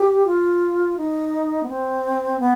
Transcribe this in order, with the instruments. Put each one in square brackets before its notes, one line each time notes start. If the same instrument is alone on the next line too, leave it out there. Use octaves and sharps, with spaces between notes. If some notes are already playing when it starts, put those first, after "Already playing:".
Already playing: [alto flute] G4
F4
D#4
B3
C4
B3